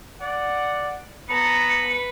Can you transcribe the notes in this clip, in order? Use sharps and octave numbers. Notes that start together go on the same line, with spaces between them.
D5 F#5
B3 B4 A5 A#5 C#7